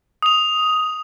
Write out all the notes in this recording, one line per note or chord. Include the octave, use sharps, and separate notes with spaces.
D#6 F7